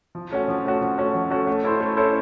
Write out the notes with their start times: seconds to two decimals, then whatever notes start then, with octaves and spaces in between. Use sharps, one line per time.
0.15 F3
0.31 A3 C#4 F#4
0.48 F3
0.65 A3 C#4 F#4
0.81 F3
0.98 A3 C#4 F#4
1.15 F3
1.30 A3 C#4 F#4
1.47 A3
1.64 C#4 E4 A4 C5
1.80 A3
1.97 C#4 E4 A4 C5